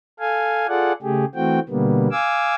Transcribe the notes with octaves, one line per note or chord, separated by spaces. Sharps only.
A4 F5 G#5
F4 G#4 A4 D5 F#5
C#3 A3 G4 G#4
E3 A3 C4 F#4 G5
B2 D3 G3 A#3 B3
F5 G#5 D6 E6